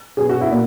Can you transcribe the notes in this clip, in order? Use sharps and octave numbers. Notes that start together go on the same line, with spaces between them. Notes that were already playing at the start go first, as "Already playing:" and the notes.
B2 F#3 B3 G#4
F#4
E4
A#2 A#3